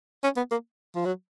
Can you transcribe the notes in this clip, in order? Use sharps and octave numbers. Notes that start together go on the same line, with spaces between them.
C#4
B3
A#3
F3
F#3